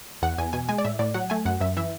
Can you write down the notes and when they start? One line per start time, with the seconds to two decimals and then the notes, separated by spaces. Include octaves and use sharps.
0.22 E2 F#5
0.38 E2 G#5
0.53 B2 G#5
0.69 G#3 G#5
0.78 D5
0.85 A2 E5
0.99 A2 D5
1.14 F#3 F#5
1.30 A3 G#5
1.45 F#2 F#5
1.61 F#2 E5
1.77 E3 E5